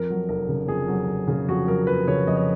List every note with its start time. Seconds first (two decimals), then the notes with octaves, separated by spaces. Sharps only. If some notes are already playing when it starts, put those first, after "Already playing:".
Already playing: F2 A#4
0.10 F#3
0.29 F1 A#4
0.49 C#3
0.68 F2 G#4
0.88 F#3
1.08 F1
1.28 C#3
1.48 F2 F#4
1.67 F#3 A#4
1.87 F1 B4
2.08 C#3 C#5
2.27 F2 D#5
2.36 C#5